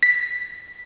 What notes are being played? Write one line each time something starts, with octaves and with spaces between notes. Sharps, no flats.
B6